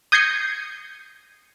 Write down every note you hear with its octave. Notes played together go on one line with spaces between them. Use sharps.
D#6 G6 G#6 A#6 C7 C#7